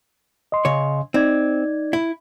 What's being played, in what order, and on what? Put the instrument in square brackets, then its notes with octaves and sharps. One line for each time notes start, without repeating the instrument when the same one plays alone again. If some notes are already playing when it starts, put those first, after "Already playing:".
[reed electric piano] D#5 C6
[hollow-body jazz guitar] C#3 C#5
[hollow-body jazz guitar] C4 [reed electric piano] D#4 D5 G#6
[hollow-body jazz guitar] E4